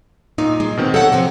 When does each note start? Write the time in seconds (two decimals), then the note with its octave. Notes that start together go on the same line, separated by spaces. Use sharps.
0.38 A#2 D#4
0.60 G#3
0.77 B2 D#3 C4
0.94 F#3 A4 F#5
1.12 C3 F3 C4